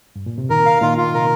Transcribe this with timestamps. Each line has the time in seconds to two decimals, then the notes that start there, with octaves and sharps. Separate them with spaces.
0.16 G2
0.26 A#2
0.38 C3
0.50 A#2 D#3 A#4
0.66 F5
0.82 A#2 D#3 F4
0.98 F4
1.14 C3 A#4